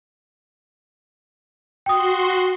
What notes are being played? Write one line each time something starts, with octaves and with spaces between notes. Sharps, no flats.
F#4 G5 C6 D#6